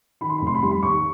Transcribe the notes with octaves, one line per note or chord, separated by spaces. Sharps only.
D#3 B5
C6
F1 B5
C6
B5
G3 C6
B5
D#2 C#6